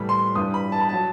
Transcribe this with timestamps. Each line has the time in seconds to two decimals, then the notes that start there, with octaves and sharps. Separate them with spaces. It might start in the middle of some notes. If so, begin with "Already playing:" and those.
Already playing: A2 E3 G3 B5
0.09 C6
0.35 G2 E3 G3 D#6
0.54 B5
0.72 A5
0.80 B5
0.89 F#3 A5